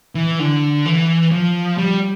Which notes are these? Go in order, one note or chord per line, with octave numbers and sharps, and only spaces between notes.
E3
D3
E3
F3
G3